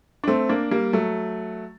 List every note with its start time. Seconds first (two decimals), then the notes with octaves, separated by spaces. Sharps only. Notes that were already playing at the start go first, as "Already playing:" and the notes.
0.24 D4
0.28 A3 C4
0.49 A#3 D4
0.71 G3 A#3
0.93 F#3 A3